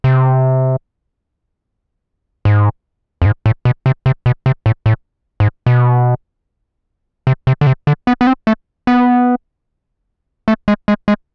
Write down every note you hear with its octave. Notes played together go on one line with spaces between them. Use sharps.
C3
G#2
F2
G#2
A2
B2
C3
C3
B2
C3
A2
A2
G#2
B2
C3
C3
D3
C3
D3
B3
B3
C4
A3
B3
A3
G#3
G#3
G#3